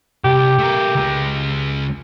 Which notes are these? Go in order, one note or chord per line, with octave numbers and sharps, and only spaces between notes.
C2 G4
A3 A#4
C#2 G#3